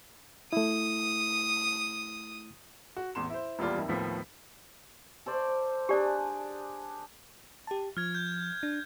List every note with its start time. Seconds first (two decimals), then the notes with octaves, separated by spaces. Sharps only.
0.53 A3 E4 D#6
2.97 F#4
3.15 A1 E2 C6 E7
3.30 E4 C5
3.59 D#1 E2 G3 F4 D5
3.77 F2 D#3 E5
3.89 D#2 A2 F3 B3 B6
5.26 A4 C5 D5
5.89 D4 G4 G#4 D5
7.67 G4 A5
7.97 F3 F6 G#6
8.15 G6
8.63 D4